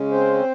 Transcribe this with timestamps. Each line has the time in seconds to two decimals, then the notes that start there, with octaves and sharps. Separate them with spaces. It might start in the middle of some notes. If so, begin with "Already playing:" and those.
Already playing: C#3 G#3 C#4
0.12 C4 C5